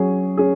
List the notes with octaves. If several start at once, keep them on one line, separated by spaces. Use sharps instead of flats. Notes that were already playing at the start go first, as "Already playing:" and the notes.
Already playing: F#3 C#4 G#4
C#4 G#4